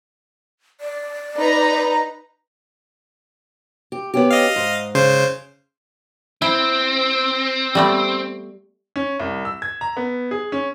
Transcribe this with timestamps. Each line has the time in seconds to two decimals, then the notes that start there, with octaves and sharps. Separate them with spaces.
0.80 D5
1.37 D#4 B4 A#5
3.92 G4
4.14 B3 C#4 G4
4.30 D#5 F5
4.56 G#2
4.95 C#3 C5
6.42 C4 E4
7.75 G3 A3 B3
8.96 C#4
9.20 C2
9.45 E6
9.62 G#6
9.81 A#5
9.97 B3
10.31 G#4
10.52 C#4